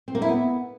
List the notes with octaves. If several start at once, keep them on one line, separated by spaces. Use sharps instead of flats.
C4
A#3
E4
B3